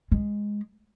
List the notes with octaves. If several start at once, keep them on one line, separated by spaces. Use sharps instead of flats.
G#3